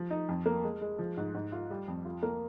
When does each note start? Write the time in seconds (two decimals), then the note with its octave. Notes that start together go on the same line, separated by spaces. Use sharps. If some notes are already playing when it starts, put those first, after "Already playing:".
Already playing: F3
0.10 D#4
0.29 F2
0.46 A#3
0.64 G#3
0.81 G#3
0.99 F3
1.17 G#2
1.35 G#2
1.52 F4
1.71 G3
1.88 F2
2.05 F4
2.23 A#3